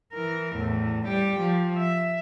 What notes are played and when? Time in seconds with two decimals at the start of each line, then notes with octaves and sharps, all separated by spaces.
0.13 E3 A#4
0.55 E2 A2
1.07 G3 G4
1.40 F3
1.79 E5